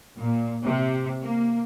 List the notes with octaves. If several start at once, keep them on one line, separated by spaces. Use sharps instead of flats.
A#2
C3
A#3